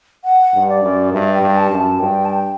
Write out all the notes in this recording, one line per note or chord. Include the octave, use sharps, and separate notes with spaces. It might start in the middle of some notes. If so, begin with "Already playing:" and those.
F#5
G2
D5
F#2
G2 E5
G5
G2
A5
F#2
A5
G2 G5
A5
G5